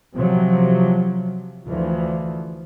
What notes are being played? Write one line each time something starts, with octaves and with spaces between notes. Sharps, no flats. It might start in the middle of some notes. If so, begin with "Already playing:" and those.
C3 F3 F#3
D2 E3 F3